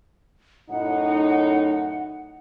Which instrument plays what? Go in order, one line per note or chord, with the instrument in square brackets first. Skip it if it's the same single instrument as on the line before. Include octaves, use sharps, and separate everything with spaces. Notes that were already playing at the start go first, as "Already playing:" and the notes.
[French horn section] F#2 A2 D#4 [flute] F#5